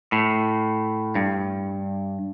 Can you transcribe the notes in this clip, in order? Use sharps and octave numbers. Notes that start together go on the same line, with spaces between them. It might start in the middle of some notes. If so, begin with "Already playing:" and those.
A2
G2